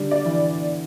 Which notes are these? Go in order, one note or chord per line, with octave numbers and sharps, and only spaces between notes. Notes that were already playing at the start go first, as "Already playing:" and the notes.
Already playing: D3 G3
D5
E3